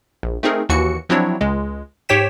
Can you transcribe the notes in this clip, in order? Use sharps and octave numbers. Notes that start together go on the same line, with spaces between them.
A#1
A3 C4 D#4 G#4 A#4
D#2 E3 F#4 C#7
F3 F#3 C4 D4 E4 C#5
C#2 G#3
G#2 G4 C#5 G5 B6 E7